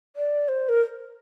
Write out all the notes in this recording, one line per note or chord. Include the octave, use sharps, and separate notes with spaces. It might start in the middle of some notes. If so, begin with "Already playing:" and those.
D5
C5
A#4